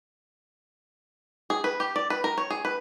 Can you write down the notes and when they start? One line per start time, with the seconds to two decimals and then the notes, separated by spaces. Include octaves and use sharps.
1.50 G#4
1.64 B4
1.80 G4
1.96 D5
2.10 B4
2.24 A#4
2.38 C#5
2.50 G#4
2.65 B4